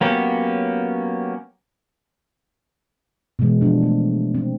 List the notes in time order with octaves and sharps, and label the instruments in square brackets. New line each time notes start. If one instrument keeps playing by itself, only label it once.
[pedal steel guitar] F#3 A#3 B3 C#4 G4
[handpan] B2 D#3 E3 G#3 B3
F3 D4
A3
C4